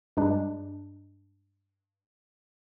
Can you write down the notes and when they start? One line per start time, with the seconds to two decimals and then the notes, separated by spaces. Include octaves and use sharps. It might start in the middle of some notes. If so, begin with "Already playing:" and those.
0.17 G2 G#3 D4